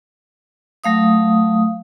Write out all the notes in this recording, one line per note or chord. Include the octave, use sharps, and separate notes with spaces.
F#3 A3 F5 D#6